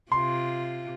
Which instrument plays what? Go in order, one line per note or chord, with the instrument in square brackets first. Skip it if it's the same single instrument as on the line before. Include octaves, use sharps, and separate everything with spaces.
[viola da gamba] C3 F4 [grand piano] C6